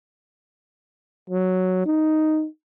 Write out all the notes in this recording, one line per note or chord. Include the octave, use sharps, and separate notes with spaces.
F#3
D#4